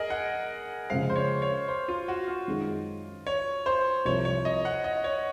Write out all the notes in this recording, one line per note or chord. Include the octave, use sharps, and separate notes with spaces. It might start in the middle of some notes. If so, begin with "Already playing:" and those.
Already playing: G#4 A#4 D#5
F#5
C#3 F3 G#3 C4 F5
C5
C#5
C#5
C5
F4
F#4
F4
F#2 D#3 G#3 D#4 G#4
C#5
C5
C2 C3 F3 C#5
C#5
D#5
F#5
D#5
C#5